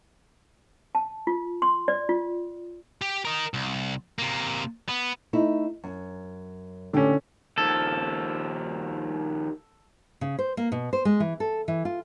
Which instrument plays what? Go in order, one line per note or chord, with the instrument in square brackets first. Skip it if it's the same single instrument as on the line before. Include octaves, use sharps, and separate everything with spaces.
[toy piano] A5
F4
C6
D5
F4
[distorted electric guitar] G4
A#4 D#5
C2
C3 A#3
B3
[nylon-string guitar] A3 D#4 E4
F#2
[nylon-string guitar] A2 G4 [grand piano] D3 C#4
[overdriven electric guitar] D#2 F3 [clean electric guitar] A4
[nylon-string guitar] C#3
C5
A#3
B2
C5
G#3
E3
A4
E3
F4